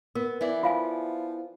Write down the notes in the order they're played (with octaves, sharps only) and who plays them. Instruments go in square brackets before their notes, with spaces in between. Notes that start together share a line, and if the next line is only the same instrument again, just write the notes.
[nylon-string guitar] B3 [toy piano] A#4
[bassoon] E3 [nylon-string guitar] B3 E4 D5
[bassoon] F3 [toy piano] F4 F5 G#5